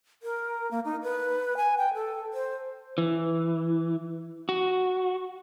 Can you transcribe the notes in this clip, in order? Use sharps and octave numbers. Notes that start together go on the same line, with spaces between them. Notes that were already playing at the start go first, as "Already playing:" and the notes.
A#4
A#3
D#4
B4
G#5
G5
A4
C5
E3
F#4